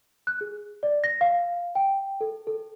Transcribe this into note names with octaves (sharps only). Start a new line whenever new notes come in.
F#6
G#4
D5
A#6
F5
G5
A4
A4